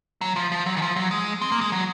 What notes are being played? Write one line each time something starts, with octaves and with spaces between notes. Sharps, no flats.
F#3
F3
F3
F#3
D#3
F3
F#3
G#3
C4
A#3
G#3
F#3